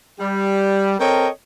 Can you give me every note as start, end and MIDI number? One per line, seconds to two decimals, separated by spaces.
0.19 0.95 55
0.99 1.29 60
0.99 1.29 69
0.99 1.29 70
0.99 1.29 73
0.99 1.29 75
0.99 1.29 79